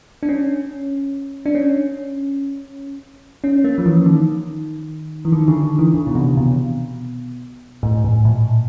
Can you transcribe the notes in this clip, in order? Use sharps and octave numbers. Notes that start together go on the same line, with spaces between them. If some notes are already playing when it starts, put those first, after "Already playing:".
D4
C#4
D4
C#4
C#4
A#3
F3
E3
D#3
E3
D#3
D3
D#3
E3
D3
B2
C3
B2
A2
A2
A#2